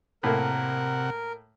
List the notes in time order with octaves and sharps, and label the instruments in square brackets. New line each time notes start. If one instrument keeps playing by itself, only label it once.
[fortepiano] A2 A#3 [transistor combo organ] C3 F#5 [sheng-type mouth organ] A#4